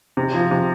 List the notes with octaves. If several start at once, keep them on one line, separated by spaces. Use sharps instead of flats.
C3
F3
C3